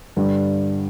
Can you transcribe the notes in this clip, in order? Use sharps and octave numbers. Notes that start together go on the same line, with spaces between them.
G2 D3 G3